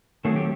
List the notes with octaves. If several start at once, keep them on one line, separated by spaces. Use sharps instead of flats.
D#3 F#3 A3 C4 G#4
G4